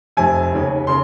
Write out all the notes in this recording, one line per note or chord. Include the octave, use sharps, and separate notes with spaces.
F1 F2 C3 G#5
F1 D#2 C#3
C#3 C6